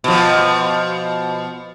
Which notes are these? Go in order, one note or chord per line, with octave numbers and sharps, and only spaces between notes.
B2 F3